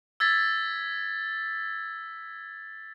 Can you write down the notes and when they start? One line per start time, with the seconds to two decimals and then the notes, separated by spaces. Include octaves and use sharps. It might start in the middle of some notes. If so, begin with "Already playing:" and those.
0.20 E6 G#6 A6 B6